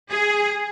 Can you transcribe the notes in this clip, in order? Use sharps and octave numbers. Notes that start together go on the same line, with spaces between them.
G#4